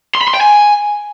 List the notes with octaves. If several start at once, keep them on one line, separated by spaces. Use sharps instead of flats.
C6
B5
C6
G5
G#5